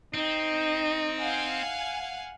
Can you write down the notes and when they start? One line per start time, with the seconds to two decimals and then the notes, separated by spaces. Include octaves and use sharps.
0.14 C4 D#4
1.19 F5 F#5 G#5